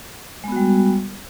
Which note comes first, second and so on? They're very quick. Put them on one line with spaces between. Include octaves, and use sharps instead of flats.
G#3 B3 F#4 G3